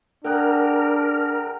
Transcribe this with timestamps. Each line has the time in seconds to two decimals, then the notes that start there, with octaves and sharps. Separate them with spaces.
0.24 D4 G#4 A#4 F#5 G5